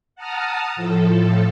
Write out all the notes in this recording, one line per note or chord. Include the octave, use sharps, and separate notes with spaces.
F#5 A5 A#5 D#6 F6
A2 F3 A4